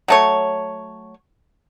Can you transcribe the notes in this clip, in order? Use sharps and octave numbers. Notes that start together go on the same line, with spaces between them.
F#3 A3 C#5